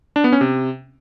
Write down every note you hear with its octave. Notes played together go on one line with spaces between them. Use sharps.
D4
B3
C#4
C3